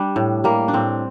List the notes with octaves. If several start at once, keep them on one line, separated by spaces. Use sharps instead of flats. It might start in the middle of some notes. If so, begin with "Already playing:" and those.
Already playing: G3 D4
A2
G3 A#3
D4
A2 C4